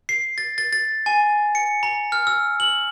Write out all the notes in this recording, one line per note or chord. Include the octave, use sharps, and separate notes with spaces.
C7
A6
A6
A6
G#5
C#7
A#5
F6
E6
F#7